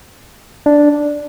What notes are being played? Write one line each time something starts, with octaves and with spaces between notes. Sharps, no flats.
D4